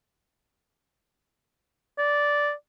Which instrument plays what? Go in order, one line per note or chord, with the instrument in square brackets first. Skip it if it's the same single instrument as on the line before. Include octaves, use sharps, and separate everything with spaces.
[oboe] D5